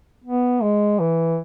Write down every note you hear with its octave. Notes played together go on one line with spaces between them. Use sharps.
B3
G#3
E3